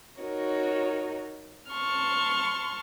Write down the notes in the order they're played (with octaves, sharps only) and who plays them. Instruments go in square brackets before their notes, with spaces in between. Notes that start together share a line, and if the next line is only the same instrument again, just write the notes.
[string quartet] D#4 F#4 A#4 C#5
A5 C6 C#6 F6